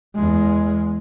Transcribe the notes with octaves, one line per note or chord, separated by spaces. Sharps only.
E2 G#3